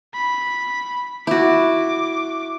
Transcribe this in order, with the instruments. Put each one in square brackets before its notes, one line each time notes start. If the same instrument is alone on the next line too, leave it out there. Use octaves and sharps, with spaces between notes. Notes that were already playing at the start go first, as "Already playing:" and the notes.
[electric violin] B5
[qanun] E4 F#4 [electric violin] D6